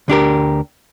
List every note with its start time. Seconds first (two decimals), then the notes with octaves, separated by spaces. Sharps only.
0.08 D2 D4 G4 A#4